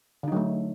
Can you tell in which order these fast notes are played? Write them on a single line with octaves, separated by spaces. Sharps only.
D3 D#4 F#3 A3